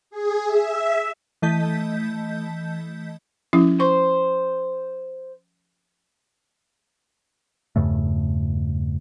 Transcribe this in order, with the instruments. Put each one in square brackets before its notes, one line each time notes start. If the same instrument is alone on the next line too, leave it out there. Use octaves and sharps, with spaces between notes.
[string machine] G#4
E5
[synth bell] E3 A3 D#5 A5 G6 B6
[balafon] F3 C#4 E4
[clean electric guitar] C5 [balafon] C#6
[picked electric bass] E2 G2 C#3 A3